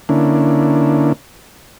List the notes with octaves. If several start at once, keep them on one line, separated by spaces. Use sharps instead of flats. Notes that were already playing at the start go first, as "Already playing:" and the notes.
D3 A#3 C#4 D4 E4